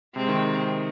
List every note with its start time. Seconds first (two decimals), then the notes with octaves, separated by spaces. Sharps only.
0.15 C3 G#3 C4
0.28 D#3